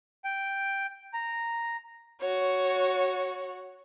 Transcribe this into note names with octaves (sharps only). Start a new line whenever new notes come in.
G5
A#5
F#4 C#5